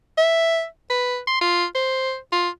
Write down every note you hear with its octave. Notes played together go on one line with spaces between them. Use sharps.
E5
B4
C6
F4
C5
F4